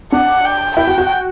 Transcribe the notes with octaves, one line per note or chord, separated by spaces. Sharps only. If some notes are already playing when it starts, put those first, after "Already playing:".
D4 F#5
G5
E4 G5
F#4
F#4